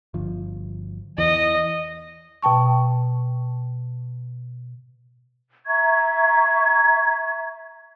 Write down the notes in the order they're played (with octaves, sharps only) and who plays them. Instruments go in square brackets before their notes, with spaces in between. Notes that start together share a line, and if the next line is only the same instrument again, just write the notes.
[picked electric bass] G1 F3
[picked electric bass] E2 E3 [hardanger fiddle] D#5
[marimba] B2 G5 A5 C#6
[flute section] E5 A#5 C#6 G#6